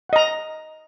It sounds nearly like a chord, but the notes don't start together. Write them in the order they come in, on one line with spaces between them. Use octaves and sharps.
F#5 D#5 A#5